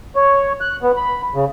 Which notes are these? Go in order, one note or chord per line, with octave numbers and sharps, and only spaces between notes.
C#5
F#6
B3
B5
C#3